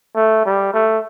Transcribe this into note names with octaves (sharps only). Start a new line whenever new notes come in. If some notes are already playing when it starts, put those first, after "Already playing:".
A3
G3
A3